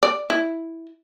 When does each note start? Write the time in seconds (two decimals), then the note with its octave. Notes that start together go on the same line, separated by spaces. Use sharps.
0.03 D5
0.30 E4